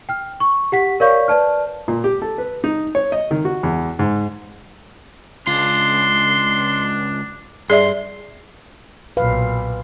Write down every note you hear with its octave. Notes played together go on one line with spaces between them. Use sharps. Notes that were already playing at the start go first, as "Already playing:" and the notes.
G5 F6
C#6
G4 F#5 B6
A#4 C#5 D5 F5 C#6 G6
B4 D5 A5 F6
A#2
G4
A4
B4
D#4
C#5
D#5
D#3
F#4
E2
G#2
C#2 D4 F4 C6
G2 G#4 D5 E5 C6
B1 A#2 B4 F5